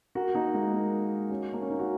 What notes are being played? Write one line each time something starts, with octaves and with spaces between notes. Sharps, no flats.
F#4 A#4
A#3 D#4
G#3
A#3
C#4 F#4
A#3
C#4
D#4
F#4